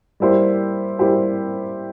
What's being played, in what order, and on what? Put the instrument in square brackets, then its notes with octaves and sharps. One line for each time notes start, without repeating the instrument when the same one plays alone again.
[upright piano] G3 A#3 E4 G4 C5
G3 A#3 E4 G4 C5